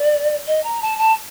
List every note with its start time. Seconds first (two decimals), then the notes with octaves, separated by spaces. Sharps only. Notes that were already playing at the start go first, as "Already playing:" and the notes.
Already playing: D5
0.47 D#5
0.64 A#5
0.82 A5
0.99 A5